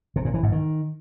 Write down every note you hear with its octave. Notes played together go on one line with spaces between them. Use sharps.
C3
A#2
E3
G#2
D#3